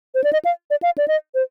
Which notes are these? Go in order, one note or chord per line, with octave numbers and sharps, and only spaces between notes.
C5
D5
D#5
F5
D5
F5
D5
D#5
C5